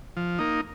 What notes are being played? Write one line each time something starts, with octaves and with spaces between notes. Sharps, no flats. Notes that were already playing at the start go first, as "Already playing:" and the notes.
F3
A#3 D#4